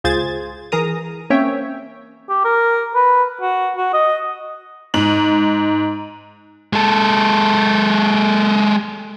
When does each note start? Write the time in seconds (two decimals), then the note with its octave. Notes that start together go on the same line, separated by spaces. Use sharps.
0.04 C#2 F4 G#4 C5 G#6 A6
0.72 E3 G#4 A#4 A#5 D#6
1.30 A#3 C4 C#4 C#5 E5 G5
2.29 G4
2.45 A#4
2.95 B4
3.42 F#4
3.77 F#4
3.94 D#5
4.94 G#2 F#7
6.73 G#3 A4